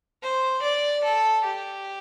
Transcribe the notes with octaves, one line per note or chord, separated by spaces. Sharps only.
C5
D5
A4
G4